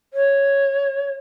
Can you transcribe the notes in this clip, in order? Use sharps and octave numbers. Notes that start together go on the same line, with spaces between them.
C#5